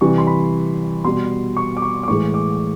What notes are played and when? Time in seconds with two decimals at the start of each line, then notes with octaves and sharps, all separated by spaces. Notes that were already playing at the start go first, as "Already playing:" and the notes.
0.01 C3 E3 G3 C#6
0.18 C6
0.27 B5
1.04 B2 G3 C6
1.57 C#6
1.77 D6
1.82 C#6
2.03 D6
2.08 A2 E3 G#3 C#6
2.34 D6